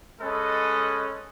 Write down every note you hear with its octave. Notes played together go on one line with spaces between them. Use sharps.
G#3 C#4 A4 B4 D#5